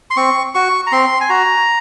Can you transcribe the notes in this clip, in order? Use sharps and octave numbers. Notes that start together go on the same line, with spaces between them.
C6
C4 C#6
F#4 C#6
A#5
C4 C6
G#5
F#4 A#5